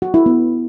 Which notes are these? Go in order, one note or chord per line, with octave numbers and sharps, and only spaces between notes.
F#4
E4
B3